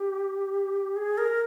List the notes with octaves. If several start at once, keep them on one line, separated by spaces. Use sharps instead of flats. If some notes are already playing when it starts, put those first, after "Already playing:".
Already playing: G4
G#4
A#4